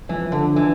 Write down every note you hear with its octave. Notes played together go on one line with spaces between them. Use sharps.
E3 F3
D3
E3 D4